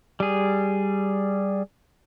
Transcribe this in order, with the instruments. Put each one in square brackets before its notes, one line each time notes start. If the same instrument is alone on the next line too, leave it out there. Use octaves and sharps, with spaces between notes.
[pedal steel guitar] G3 G#4